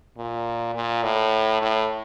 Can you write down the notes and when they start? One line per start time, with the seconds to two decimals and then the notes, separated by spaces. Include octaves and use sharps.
0.18 A#2
0.75 A#2
1.03 A2
1.62 A2